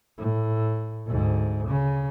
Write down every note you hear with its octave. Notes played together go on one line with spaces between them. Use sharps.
A2
D2 G#2
C#3